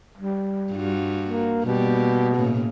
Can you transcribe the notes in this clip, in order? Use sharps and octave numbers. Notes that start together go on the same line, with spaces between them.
G3
G2 F4 F#4
A#3
B2 G3 A#3 G4
A2 C#3 A#3